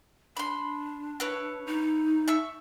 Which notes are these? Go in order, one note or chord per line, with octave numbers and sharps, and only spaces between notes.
D4 B5 C6
E4 B4 C#5
D#4
E5 C#6 E6